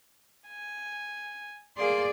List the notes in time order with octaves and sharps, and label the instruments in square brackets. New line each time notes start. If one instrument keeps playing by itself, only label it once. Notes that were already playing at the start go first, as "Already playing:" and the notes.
[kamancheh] G#5
[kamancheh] A#3 C6 [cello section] G#4 D5